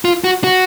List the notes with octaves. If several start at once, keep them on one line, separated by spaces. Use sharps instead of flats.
F4
F#4
F#4